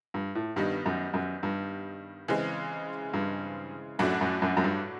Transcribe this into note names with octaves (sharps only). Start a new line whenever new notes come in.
G2
A2
G2 D#3 G3 B3 D#4
F#2
F#2
G2
C#3 E3 G#3 C4
G2
F#2 A2 F#3 A3 D4 F#4
F#2
F#2
F#2
G2